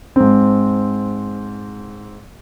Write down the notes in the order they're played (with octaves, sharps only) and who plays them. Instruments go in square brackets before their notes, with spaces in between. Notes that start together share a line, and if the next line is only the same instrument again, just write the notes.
[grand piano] G#2 C4